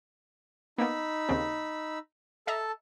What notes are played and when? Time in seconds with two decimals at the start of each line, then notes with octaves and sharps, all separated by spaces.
0.78 A#3 B3 D#4 B5 E6
1.29 D#2 C#3 C4
2.47 A4 D#5 E5 A5 A#5